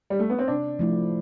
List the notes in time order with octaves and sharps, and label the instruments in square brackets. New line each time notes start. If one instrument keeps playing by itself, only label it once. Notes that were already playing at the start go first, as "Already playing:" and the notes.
[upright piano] G3
A3
B3
C4
[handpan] C3 [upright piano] D4
[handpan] F3 A3 E4